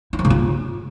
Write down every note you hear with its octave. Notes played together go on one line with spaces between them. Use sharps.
E4
F3
C#3
F4